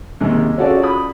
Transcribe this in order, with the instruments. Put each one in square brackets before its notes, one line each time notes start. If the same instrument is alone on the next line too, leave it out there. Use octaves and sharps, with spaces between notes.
[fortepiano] D#2 C3 G#3
C#4 F4 F#4 G#4 A4 D5
B5 D#6